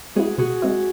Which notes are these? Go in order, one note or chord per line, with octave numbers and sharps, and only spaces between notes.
G#3 C4 E4 F#4 G#4
B2 F#4 G#4
G#3 C4 E4